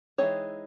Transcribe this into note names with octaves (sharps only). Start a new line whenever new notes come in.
E3 G#3 C4 D#4 C#5